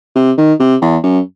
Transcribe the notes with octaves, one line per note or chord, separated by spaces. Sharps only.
C3
D#3
C3
E2
F#2